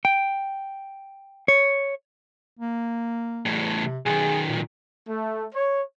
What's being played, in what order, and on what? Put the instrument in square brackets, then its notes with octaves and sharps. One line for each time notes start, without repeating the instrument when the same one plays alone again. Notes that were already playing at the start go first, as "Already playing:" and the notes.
[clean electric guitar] G5
C#5
[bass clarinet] A#3
[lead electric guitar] E2 A2
[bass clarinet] C3
[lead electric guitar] B1 D#3 [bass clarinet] G#4
[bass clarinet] A#2
[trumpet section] A3
C#5